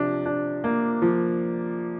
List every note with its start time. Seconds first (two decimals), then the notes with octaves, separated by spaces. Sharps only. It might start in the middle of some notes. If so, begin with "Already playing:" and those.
Already playing: C3 F3 D4
0.26 D4
0.64 A#3
1.02 F3